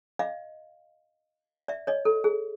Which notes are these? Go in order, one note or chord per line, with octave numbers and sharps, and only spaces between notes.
D#5 F5
D5 E5
C#5 D#5
A4
G#4